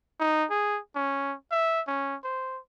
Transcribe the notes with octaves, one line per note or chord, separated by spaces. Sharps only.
D#4
G#4
C#4
E5
C#4
C5